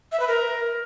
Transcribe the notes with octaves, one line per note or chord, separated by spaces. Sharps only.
E5
B4
A#4